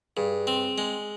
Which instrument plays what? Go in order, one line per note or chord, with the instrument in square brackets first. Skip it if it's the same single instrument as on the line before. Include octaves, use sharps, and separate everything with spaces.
[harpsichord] G2 [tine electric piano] G#4
[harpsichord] C4
G#3